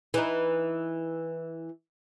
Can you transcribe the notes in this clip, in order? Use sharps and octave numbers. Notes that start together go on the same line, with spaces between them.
E3 D#4